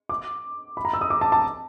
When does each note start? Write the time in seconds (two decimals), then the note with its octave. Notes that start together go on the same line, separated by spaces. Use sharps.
0.09 D6
0.77 B5
0.85 A#5
0.93 E6
1.01 D#6
1.10 D6
1.21 A5
1.32 A5